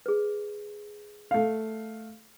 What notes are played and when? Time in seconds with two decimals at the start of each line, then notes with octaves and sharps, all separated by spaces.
0.06 G#4 B4
1.31 A3 F5